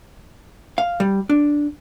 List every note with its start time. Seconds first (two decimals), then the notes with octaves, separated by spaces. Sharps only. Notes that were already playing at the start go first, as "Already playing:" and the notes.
0.78 F5
1.00 G3
1.29 D4